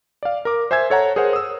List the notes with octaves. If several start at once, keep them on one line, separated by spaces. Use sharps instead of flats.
D5 F5
A#4 D6
C5 E5 G#5 E6 G#6
A4 C#5 F#5 A#5
G#4 A#4 C5 C#5 F#5
D#6 E6